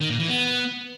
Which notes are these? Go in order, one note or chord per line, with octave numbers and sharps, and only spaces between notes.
D#3
A#2
E3
B3